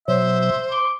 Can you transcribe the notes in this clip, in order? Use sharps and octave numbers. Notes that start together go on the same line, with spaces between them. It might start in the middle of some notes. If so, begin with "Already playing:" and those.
B2 F#3 C5 E5
C6 D6